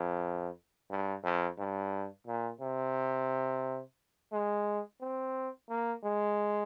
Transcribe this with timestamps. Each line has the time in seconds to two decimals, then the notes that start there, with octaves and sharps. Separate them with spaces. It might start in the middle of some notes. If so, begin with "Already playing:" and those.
Already playing: F2
0.91 G2
1.24 F2
1.59 G2
2.27 A#2
2.61 C3
4.33 G#3
5.01 C4
5.69 A#3
6.04 G#3